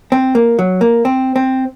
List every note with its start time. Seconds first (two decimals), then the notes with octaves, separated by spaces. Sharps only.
0.12 C4
0.35 A#3
0.59 F#3
0.81 A#3
1.05 C4
1.36 C4